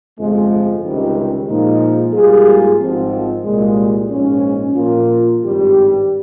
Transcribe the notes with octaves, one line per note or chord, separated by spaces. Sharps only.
G1 F2 C3 F3 G#3
C#2 C3 D#3 G3 C#4
A#2 F3 G#3 D#4
G#2 G3 A#3 F4 G#4
G#1 G#2 F3 C4
C2 A#2 G#3
A#1 G#2 F3 G#3 C#4
A#2 F3 A#3 F4
G#1 G2 G3 C4 G4